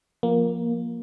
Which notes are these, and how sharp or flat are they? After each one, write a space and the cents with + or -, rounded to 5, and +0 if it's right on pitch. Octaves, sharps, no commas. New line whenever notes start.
F3 +0 A#3 +10